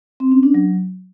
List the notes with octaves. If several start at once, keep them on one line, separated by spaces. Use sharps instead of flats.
C4
C#4
D4
F#3